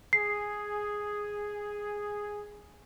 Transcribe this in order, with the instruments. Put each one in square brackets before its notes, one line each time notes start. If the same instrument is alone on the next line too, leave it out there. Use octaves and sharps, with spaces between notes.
[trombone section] G#4 [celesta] C7